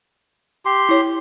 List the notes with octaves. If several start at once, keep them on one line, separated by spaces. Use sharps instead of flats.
G4 C6
E4 C#5